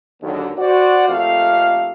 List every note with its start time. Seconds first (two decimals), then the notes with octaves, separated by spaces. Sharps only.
0.22 D#2 G#2 D3 F#3
0.59 F#4 C5 D5 F#5
1.08 F2 A#2 D#3 A3 G4 F5